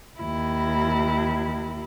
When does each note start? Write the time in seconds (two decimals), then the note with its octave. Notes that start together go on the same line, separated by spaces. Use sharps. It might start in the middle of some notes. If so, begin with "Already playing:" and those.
0.20 D#2 E4